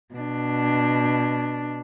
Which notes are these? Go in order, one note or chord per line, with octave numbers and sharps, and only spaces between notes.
B2 D4